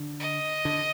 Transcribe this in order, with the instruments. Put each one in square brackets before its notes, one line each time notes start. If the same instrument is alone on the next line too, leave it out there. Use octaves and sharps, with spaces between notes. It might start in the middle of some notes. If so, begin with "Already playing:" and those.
Already playing: [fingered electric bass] D3
[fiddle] D#5
[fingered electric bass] D3